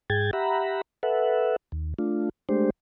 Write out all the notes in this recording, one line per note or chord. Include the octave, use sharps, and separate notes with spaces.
G#2 G#4 G5 G#6 A6
G4 E5 F#5 A#5 B5
A4 B4 E5 F#5
D#2
A3 D4 F4
G#3 A3 D4 G4 C5